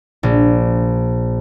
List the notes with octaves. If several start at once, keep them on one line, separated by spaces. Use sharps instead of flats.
A#1